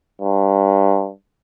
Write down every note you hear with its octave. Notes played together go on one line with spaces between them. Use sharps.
G2